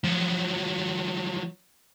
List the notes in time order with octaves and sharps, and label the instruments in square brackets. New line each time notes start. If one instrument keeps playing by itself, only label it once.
[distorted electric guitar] F3 F#3